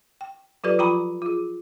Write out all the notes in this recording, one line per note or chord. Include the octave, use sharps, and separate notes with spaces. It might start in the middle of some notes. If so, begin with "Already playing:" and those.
G5
F#3 F4 G4 A4 B4 D5
F3 F4 G5 A#5 B5 C#6
F4 G#4